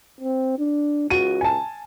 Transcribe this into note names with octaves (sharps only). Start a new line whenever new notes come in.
C4
D4
C#2 F#4 D#7
G#5 A5